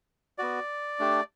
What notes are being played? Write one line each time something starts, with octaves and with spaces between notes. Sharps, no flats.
B3 F#4 D5
A3 D4 G4